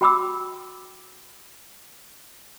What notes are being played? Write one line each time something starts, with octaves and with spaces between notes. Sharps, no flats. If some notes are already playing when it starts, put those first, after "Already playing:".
F#4 G5 B5 D6 E6